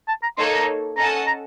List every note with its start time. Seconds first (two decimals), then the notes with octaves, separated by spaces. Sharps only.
0.08 A5
0.23 A#5
0.38 A#3 D#4 A4 C#5 C6
0.53 A#5
0.97 C#4 A4 D#5 F#5 A5 A#5
1.27 A#5